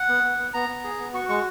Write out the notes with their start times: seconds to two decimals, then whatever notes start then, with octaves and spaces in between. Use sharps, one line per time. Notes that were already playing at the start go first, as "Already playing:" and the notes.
Already playing: F#5
0.08 B3
0.23 B3
0.38 B3
0.54 B3 A#5
0.69 B3
0.84 G#4
0.99 B3
1.14 F#4 C#6
1.28 G#3 C#6